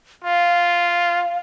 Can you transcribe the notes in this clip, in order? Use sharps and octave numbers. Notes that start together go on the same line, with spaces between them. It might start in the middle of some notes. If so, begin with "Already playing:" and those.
F4 F5